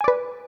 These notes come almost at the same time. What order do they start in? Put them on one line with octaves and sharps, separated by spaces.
G#5 D5 B4